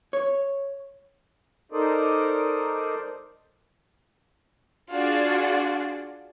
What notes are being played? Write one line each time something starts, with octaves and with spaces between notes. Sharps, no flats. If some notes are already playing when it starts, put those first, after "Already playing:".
C#5
D#4 A4 A#4 C5 D5 D#5
D4 F4 F#4 G#4 D5